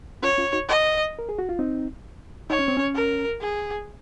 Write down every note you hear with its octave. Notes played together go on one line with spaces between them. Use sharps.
C#4 F4 C#5
C#4 F4
D#4 F#4
D#5
A#4
G#4
F#4
F4
C4 D#4
D#4 C#5
C#4
C4
C#4
A#4
G#4